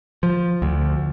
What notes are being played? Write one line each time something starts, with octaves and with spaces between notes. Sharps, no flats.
F3
D2